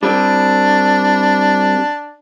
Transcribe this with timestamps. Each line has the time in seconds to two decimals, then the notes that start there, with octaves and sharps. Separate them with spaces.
0.03 G3 C4 D4